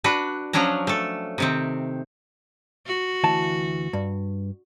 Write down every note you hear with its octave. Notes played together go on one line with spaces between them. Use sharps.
D4 F#4 B4
F3 F#3 C#4 D4 A#5
A3 A4
C3 D#3 C4
F#4
D2 E3 A5
G2